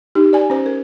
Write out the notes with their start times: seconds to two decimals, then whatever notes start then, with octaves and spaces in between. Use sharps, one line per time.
0.15 D#4 G4
0.33 D5 G#5
0.50 C#4 C5
0.66 A#4